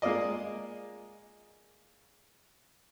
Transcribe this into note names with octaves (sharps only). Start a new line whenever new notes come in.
G#3 A#3 F4 D5 D#5